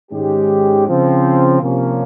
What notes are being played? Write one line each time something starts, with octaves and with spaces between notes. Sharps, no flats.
G#2 D#3 G#3 C#4 G4
C#3 F3 C4
C3 F3 A#3 C#4